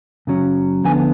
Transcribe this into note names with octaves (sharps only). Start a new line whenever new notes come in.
F#2 C#3 F#3 C#4
D2 D3 F3 B3 G#5